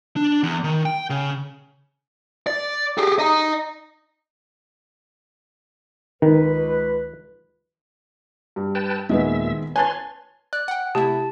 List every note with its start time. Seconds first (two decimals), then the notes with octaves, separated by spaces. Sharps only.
0.16 D4
0.43 E2
0.64 D#3
0.86 G5
1.10 C#3
2.47 D5
2.98 G4 G#4
3.19 D#5 A#5
6.22 C#2 D#3 B4
8.56 G2
8.75 B4 G5 A5
9.09 D#2 A#2 D#3 G#3 B3 E5
9.76 B4 C#5 G#5 A5 C6 A6
10.53 D5 F#6
10.68 F#5 G5
10.95 C3 A3 E4 G4 A5